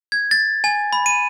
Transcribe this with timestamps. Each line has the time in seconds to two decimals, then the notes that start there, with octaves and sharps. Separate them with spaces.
0.12 G#6
0.31 A6
0.64 G#5
0.93 B5
1.06 D#7